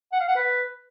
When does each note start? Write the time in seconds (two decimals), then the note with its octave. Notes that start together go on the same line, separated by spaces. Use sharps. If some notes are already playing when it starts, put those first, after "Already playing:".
0.12 F#5
0.20 F5
0.28 F#5
0.36 B4